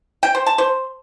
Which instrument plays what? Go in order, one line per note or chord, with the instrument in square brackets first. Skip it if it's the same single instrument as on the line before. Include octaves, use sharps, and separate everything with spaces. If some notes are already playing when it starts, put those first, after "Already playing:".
[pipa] G5
C5
A5
C5